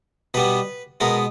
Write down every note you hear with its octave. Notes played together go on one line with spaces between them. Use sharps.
B2 G3 B3 B4
B2 G#3 B3 A#4